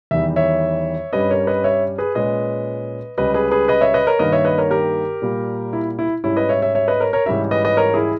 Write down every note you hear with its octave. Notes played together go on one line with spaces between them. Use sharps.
E2 D#3 G3 E5
C#5 E5
G2 G3 C#4 B4 D#5
A#4 C#5
B4 D#5
C#5 E5
G#4 B4
A#2 G#3 C#4 B4 D#5
C#2 C#3 G3 B4 D#5
G#4 B4
G#4 B4
B4 D#5
C#5 E5
B4 D#5
A#4 C#5
G2 D#3 A#3 B4 D#5
C#5 E5
B4 D#5
A#4 C#5
G4 A#4
A#2 G3 A#3
E4
E4
G#2 G3 C#4 E4
B4 D#5
C#5 E5
C#5 E5
C#5 E5
B4 D#5
A#4 C#5
A#4 C#5
G#2 E3 G3 C#4 C#5 E5
B4 D#5
B4 D#5
A#4 C#5
E4 G#4